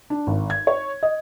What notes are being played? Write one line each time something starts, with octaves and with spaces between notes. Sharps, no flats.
D4
G#1
G#6
C#5
D#5